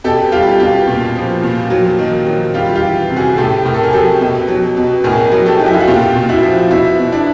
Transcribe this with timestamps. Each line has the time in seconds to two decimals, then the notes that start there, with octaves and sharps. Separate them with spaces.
0.04 B2 G4 A4
0.32 G3 F4 G4
0.60 B2 F4 G4
0.87 A#2
1.16 F3
1.43 A#2
1.70 F#3
1.99 D#3
2.27 F#3
2.54 G3 F4 G4
2.75 F4 G4
2.82 E3
3.10 C3
3.16 F#4 G#4
3.37 A2 G4 A4
3.65 A2 A#4
3.74 A4
3.83 G#4 A#4
3.93 F#3 G4 A4
4.21 B2
4.48 F#3
4.77 B2
5.04 A2 G#4 A#4
5.32 F#3
5.46 G4 A4
5.59 F#3 D#4
5.66 E4
5.74 F4
5.81 F#4
5.87 A#2 F4 G4
6.16 A#2
6.29 E4 F#4
6.43 F3
6.70 B2 E4 F#4
6.99 B2
7.12 D4 E4